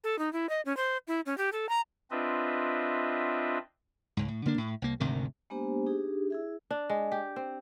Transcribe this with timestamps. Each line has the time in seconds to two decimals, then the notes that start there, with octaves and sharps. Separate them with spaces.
0.04 A4
0.19 D#4
0.33 E4
0.49 D#5
0.65 C#4
0.77 C5
1.08 E4
1.26 C#4
1.38 G4
1.53 A4
1.69 A#5
2.11 C4 D4 F4 B4 D#5 E5
4.17 C#2 G#2
4.28 A2
4.46 D3 A#3 D4
4.58 A2
4.82 C2 A#3
5.00 G#1 D2 C3 D#3
5.50 G#3 A#3 B3 D4 G4 C5
5.86 D4 D#4 G4 G#4
6.30 E4 G#4 E5
6.70 D4
6.90 G#3
7.12 G4
7.36 C4